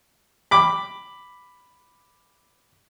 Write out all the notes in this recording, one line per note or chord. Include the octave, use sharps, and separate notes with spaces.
B5 D6